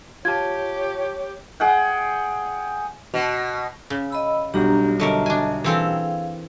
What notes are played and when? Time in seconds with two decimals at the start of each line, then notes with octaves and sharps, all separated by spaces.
0.25 F4 G4 C#5 A5 G#6
1.60 G#4 F#5 G5
3.14 B2
3.90 C#3
4.10 D#5 B5 E6
4.54 B1 G3 D4 F#4 G4 A#5
5.00 D3 F#3 A#4 D#5 E5 A5
5.26 D4 G#5
5.64 E3 C4 G#4 A4 F5 G5